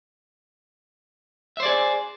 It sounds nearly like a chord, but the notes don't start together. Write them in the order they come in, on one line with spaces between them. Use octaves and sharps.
E5 C5 D5 G#4